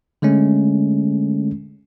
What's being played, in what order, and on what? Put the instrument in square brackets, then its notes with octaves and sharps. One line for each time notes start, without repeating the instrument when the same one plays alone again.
[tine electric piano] D3 G#3 A3 C#4